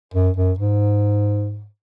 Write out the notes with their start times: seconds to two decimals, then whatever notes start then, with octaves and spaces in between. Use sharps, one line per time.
0.14 F#2
0.37 F#2
0.58 G#2